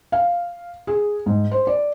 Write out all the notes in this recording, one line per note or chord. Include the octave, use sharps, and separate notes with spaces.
F5
G#4
G#2
C5
D5